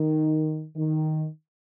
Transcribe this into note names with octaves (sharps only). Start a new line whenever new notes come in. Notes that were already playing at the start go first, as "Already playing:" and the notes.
Already playing: D#3
D#3